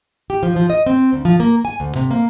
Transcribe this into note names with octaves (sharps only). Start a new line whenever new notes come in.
G4
F3
F3
D#5
C4
D2
F3
A#3
G#5
D2
C3
A#3